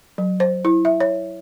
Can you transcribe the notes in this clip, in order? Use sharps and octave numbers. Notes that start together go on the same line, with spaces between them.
F#3
C5
E4
E5
C#5